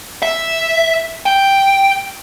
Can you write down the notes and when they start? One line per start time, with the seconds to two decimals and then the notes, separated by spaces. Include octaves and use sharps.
0.22 E5
1.26 G5